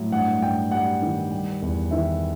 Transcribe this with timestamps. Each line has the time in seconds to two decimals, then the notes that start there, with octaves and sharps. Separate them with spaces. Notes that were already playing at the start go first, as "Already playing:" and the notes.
Already playing: A2 F#3
0.12 G2 F#5
0.41 G2 G5
0.71 G3 F#5
1.02 D#3
1.32 G3
1.62 E2
1.91 D#3 E5